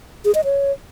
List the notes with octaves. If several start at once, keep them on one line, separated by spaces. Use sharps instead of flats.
G#4
D#5
C#5